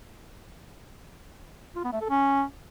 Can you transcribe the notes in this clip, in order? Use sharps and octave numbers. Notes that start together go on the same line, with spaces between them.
F4
B3
A3
A4
C#4